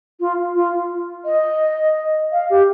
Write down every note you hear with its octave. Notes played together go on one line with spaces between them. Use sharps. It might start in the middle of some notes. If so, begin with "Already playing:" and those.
F4
F4
D#5
F5
G4